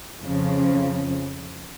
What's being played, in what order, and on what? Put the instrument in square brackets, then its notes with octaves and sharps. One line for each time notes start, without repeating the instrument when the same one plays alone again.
[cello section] F2 C#3 F3